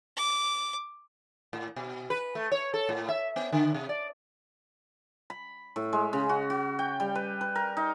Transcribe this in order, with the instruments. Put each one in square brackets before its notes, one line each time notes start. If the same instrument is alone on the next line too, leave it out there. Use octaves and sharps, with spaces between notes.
[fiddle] D6
[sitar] A2
B2
B4
A3
C#5
A4
A2
E5
B3
D3
C3
D5
[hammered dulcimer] B5
A2
G#3
C#3
F#4
F#4
G5
G3
B4
B4
A#4
D#4